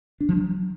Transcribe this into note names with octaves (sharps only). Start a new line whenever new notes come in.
D4
F3
F#3